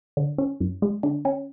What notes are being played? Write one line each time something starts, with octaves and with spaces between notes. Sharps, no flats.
D3
C#4
F#2
G#3
D3
C#4